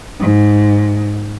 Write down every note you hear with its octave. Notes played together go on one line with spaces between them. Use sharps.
G#2